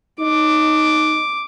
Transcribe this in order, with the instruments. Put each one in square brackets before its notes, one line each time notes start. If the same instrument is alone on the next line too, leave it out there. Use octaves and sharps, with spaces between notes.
[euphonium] D#4 [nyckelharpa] D6